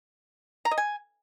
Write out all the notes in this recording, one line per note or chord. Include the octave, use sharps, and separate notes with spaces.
A#5
D#5
G#5